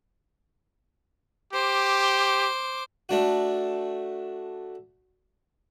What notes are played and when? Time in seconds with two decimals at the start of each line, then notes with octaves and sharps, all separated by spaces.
1.53 G4 C5 D6
3.09 A3 D4 F#4